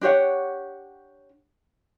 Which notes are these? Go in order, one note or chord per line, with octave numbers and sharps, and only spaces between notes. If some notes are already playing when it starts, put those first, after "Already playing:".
D4 G4 C#5 F#5